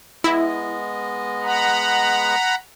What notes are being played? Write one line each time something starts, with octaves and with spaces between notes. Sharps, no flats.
G#3 B3 E4 D#5
F#5 A#5 B5